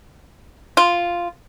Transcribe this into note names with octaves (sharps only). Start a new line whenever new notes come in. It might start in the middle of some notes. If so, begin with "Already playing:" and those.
F4